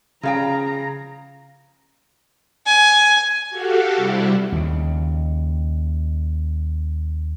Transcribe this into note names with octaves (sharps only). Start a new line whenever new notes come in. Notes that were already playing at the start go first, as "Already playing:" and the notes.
C#3 F3 F5 G5 A#5
G#5
F#4 G4 A4 F5 F#5
C3 G3 E4
D#2 C#3